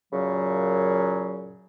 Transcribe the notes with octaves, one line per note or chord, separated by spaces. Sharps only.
F#2 A#2 C#3 F#3